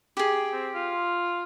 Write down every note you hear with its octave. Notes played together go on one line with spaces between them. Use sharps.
G4 G#4
C4
F4